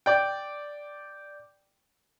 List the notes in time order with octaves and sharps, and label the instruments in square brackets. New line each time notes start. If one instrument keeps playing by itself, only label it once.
[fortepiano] D5 G5